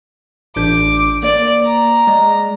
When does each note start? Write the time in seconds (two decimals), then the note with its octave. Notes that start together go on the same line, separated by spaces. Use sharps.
0.56 A1 D4 D6 G6
1.23 A#3 D5
1.66 A#5
2.07 G#3 D5 D#5